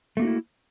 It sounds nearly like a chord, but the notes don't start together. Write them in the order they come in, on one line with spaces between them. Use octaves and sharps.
A3 A#3 F#4 D#4 E4